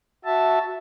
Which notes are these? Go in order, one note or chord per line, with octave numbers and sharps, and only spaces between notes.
F#4 E5 A5